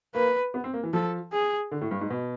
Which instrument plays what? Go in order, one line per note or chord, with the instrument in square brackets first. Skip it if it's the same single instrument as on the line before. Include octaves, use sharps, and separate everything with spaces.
[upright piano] A#3 [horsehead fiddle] B4
[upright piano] B3
C4
A#3
E3
[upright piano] F3 [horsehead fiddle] A4
[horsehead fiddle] G#4
[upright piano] D3
A2
G2
G#2
B2